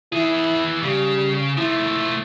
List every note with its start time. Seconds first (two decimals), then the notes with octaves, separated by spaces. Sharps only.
0.13 E3 E4 G#4
0.83 C#3 G3
1.58 F3 A3 E4